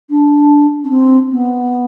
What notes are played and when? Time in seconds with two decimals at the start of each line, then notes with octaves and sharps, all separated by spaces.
0.10 D4
0.84 C#4
0.89 C4
1.30 B3